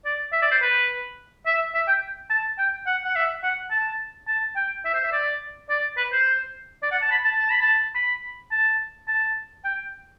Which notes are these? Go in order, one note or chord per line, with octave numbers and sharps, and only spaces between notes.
D5
E5
D5
C5
B4
E5
E5
G5
A5
G5
F#5
F#5
E5
F#5
A5
A5
G5
E5
C5
E5
D5
D5
B4
C5
D5
F#5
A5
B5
A5
A5
B5
A5
B5
A5
A5
G5